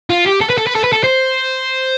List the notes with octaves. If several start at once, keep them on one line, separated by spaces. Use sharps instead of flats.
F4
G4
A4
B4
A4
B4
A4
B4
A4
C5